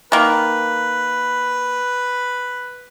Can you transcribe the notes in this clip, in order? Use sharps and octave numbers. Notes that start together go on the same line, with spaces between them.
D#3 A#3 B4